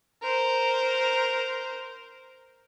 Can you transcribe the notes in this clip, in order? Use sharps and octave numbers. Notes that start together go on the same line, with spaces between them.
A#4 C5